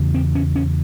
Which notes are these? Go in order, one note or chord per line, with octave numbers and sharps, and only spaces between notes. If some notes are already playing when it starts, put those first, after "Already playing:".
Already playing: E2 C#3
C4
C#4
C#4